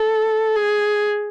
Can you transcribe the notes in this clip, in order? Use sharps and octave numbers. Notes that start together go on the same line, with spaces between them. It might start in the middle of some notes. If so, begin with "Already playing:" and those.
Already playing: A4
G#4